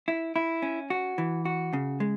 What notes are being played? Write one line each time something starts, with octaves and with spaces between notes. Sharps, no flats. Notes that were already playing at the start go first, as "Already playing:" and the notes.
E4
E4
C#4
F#4
E3
F#4
C#3
G#3